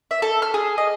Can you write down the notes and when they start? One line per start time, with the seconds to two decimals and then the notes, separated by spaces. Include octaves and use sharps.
0.11 E5
0.22 A4
0.42 F6
0.54 G#4
0.78 D#5